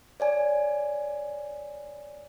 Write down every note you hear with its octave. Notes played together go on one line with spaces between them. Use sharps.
C#5 D5 G#5